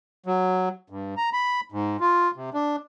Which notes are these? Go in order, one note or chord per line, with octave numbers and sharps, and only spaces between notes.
F#3
G2
A#5
B5
G#2
F4
C3
D4